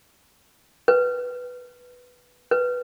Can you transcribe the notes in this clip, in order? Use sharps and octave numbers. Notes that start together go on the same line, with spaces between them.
B4
B4